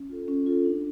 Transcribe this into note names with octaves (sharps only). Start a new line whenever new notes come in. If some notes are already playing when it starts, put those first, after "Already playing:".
Already playing: C#4
F4 A4
C#4
F4 A4
D4